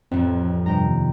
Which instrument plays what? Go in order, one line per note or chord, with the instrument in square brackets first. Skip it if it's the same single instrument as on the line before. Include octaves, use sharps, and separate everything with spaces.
[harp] A1 F2 [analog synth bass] C4
[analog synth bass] G2 [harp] C3 G5 A#5
[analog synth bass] D#2